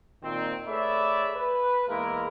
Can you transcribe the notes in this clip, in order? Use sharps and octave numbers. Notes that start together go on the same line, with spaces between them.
A#2 D#3 C4
A3 G#4 B4 C#5 D5 E5
B4
E2 G#3 A#3 E4 A#4